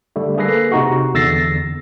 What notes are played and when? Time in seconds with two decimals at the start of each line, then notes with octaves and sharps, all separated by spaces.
0.16 D3 G3 A3
0.38 A#3 G#4 A4 B4 A#6 C7
0.72 C3 D#4 F#4
1.14 E2 D3 E6 A6 A#6 C7